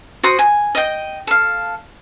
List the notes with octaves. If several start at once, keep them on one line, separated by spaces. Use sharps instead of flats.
F#4 C5 D#6
G#5
D#5 G5
A4 F5